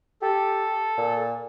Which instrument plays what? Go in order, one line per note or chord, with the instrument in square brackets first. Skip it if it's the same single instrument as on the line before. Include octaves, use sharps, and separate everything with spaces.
[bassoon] G4 [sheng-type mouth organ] A4
[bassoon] A#2